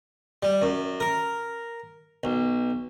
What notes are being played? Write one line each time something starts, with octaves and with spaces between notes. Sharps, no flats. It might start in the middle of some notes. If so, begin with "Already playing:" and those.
G3
F#2
A#4
B1